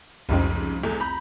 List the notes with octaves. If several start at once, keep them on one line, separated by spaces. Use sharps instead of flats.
F1 C2 F2 G#2 C#3
E2 A3
A#5 B5 G6